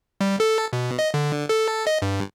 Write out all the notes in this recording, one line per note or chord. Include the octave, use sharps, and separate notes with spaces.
G3
A4
B2
D#5
D3
A4
D#5
G2